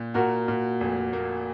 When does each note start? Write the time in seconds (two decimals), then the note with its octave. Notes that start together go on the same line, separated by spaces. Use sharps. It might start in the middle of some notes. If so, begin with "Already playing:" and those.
Already playing: A#2
0.14 A#2 F#4 A#4
0.48 A#2
0.81 F1
1.13 A#3